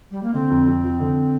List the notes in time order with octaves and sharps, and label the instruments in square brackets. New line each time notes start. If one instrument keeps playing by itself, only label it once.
[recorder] G3
A#3
[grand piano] D3 [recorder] C4
[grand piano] F2
F2
F3
D3